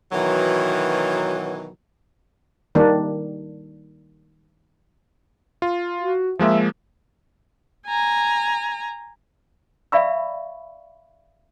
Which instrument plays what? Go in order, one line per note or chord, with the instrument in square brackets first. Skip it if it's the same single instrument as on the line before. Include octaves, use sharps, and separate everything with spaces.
[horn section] B2 D#3 E3 F#3
[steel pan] D#3 G3 A#3 D4
[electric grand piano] F4
[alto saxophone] F#4
[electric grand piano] F3 G#3 A#3 [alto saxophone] E5
[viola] G#5 A#5
[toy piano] D5 E5 F5 B5 C#6 E6